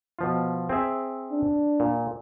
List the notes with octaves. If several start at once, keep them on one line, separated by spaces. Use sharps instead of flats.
B2 F3 F4
C4 G#4 E5
D4
A#2